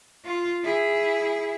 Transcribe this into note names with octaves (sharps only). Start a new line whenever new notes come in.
F4
E4 G#4